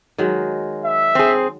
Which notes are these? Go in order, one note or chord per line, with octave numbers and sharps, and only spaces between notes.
D#3 F#3 G#3
E5
C4 G#4